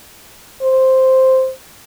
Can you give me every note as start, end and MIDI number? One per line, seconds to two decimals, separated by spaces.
0.62 1.51 72